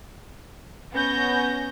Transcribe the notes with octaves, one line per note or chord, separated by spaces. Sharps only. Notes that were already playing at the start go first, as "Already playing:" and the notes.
B3 C#4 G6 A#6